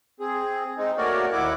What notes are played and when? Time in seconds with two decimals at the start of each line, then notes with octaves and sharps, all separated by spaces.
0.20 C4 G#4
0.77 G#3 C4 D#4
0.98 A3 A#3 F#4 A#4 C#5 D5
1.32 D#2 E4 F#5 D6